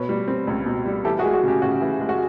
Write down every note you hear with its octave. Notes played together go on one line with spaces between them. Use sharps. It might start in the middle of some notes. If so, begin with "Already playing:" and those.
Already playing: B2 B4 C#5
G3
C4
C#2
B2
G3
E3 G4 A4
F#4 G#4
G#3
F#4
C#3 G4
C#3 F#4
E3
G#3
F#4